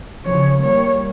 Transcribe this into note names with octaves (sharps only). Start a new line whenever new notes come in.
C#3 F3 C#5
G3 A#3 C#5